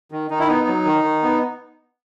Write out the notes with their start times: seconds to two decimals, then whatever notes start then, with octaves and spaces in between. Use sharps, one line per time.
0.12 D#3
0.30 D#3 D#4
0.39 E4
0.48 B3 D#4
0.68 F#3
0.85 D#3
1.04 D#3
1.23 B3